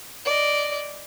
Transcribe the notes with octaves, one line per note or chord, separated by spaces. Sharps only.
D5 D#5